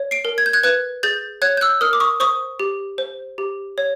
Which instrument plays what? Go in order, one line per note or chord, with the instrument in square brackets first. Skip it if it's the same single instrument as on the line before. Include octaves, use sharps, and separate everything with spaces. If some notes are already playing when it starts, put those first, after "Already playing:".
Already playing: [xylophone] C#5
C7 D7
A#4
G#6
G6
F#6 G#6
B4 F#6 G#6
G#4 G6 A6
C#5 F#6 G#6
G6
E6 F#6
A#4 D#6 F6
D6
C#6 D#6
C5 C#6 D#6
G4
C5
G4
C#5